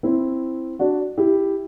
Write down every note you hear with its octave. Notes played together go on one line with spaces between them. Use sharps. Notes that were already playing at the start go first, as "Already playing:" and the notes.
C4 E4
D4 F#4
E4 G4